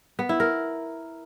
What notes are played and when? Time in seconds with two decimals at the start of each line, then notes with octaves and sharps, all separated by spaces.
0.19 B3
0.29 E4
0.40 A#4